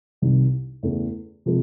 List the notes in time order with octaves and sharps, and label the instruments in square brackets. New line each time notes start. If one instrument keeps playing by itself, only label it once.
[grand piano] C2 C3 D#3 G3
E2 C#3 E3 A3
C3 F3 G#3